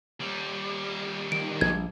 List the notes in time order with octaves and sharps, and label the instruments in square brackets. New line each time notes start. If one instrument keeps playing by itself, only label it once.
[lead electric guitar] D#2 G3
[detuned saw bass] D#3 [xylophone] D7
[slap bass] A#1 [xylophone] G#6